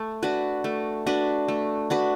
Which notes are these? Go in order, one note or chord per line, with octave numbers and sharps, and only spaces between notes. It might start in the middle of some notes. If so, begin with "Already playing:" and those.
Already playing: A3
D4 F#4 B4
A3
D4 F#4 B4
A3
D4 F#4 B4